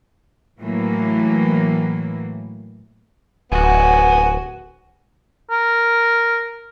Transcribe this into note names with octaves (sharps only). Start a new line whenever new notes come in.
A2 E3 F#3 A#3
D1 B3 F#4 G#5
A#4